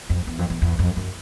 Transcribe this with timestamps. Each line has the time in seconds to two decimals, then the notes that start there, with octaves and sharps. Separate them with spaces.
0.10 F2
0.27 E2
0.39 F2
0.50 E2
0.62 E2
0.79 F2
0.97 F#2